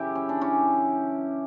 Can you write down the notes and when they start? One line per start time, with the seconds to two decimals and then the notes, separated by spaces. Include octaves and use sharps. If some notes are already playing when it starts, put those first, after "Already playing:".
Already playing: F#2 C#3 E3 E4 G4
0.15 C#4
0.29 D4
0.41 C#4 E4